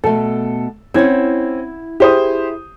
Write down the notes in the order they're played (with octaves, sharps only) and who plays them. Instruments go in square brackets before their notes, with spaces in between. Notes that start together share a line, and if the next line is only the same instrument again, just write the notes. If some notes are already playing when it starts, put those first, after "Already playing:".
[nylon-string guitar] B2 A3 [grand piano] A4
[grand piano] C4 C#4 G#6 [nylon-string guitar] E4 F#5
[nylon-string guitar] E4 G#4 [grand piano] G4 C5 D#6